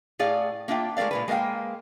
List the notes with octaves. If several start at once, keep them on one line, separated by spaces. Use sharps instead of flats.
A2 G#4 D5 F5
A#3 D4 F4 E5 G5
G#3 A3 A#4 D5 F5
A#2 G#3 B4
G#3 A#3 B3 F5 G5